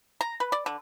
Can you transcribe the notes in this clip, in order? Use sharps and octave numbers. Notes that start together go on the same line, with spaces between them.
A#5
B4
D5
D3